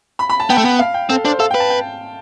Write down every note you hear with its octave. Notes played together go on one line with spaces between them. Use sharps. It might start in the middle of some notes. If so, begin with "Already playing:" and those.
B5
B5
A5
B3 G5
A3
B3
F5
G5
C4 A4
D4 C5
A4 F5
B4 G5
A5
G5